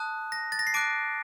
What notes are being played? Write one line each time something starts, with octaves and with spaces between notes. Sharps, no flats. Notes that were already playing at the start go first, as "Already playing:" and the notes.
Already playing: A5 D#6 F#6
A#6
A6
A#6
C7
A5 D6 F#6 D7